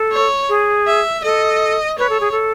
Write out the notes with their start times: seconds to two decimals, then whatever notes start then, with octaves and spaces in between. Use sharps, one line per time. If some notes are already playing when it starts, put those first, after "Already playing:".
Already playing: A4
0.12 C#5
0.49 G#4
0.87 E5
1.24 A4 D#5
1.98 B4 C#5
2.09 A4
2.20 G#4
2.32 A4